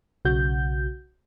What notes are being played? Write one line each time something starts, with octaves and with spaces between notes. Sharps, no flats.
B1 C#3 F#4 G6